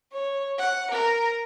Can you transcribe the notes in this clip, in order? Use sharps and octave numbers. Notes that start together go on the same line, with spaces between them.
C#5
F#5
A#4